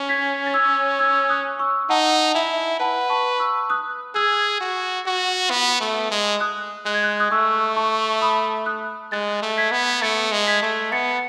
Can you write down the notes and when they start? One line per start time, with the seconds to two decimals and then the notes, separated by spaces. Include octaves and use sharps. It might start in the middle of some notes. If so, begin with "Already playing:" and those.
Already playing: C#4
0.09 G#6 B6
0.46 A6
0.54 E6 G#6
0.99 E6 G#6
1.29 D#6 F#6
1.59 C#6 E6
1.89 D#4 F#5 A5
2.34 E4 E5 G#5
2.80 B4 F#5 A5
3.10 A5 C#6
3.40 C#6 E6
3.70 D#6 F#6
4.15 G#4 E6 G#6
4.61 F#4
5.06 F#4
5.50 B3
5.81 A3
6.11 G#3
6.40 D#6 F#6
6.85 G#3 F#6
6.94 G#6
7.04 F#6
7.12 G#6
7.20 D#6 F#6
7.31 A3 C#6 E6
7.76 A5 C#6
8.22 B5 D#6
8.66 D#6 F#6
9.12 G#3 F#6 A6
9.42 A3
9.57 G#6 B6
9.71 B3
10.02 A3 A6 C#7
10.32 G#3
10.47 G#6 B6
10.62 A3
10.92 B3 A6 C#7